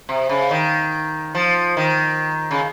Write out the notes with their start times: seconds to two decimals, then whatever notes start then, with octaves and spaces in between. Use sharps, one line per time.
0.09 C3
0.29 C#3
0.51 D#3
1.35 F3
1.77 D#3
2.51 C#3